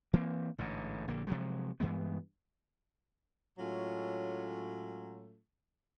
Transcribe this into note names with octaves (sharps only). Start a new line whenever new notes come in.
E3 A#3 C4
A1 G#2 D3
A#1 D3 A#3
C3 F3 F#3 G#3
G2 E3 G#3 B3
A2 F#3 G#3 A3 C#4 F4